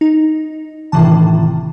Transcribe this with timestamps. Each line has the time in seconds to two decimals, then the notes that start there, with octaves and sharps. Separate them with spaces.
0.01 D#4
0.92 G1 A2 C3 D#3 E3 A5